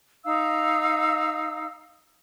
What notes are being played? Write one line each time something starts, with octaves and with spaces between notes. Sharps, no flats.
D#4 F5 E6